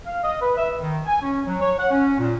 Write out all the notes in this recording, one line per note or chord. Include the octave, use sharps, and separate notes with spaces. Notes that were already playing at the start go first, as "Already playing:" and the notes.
F5
D#5
B4
E5
D#3
G#5
C#4
F#3
C#5
F#5
C#4
A#2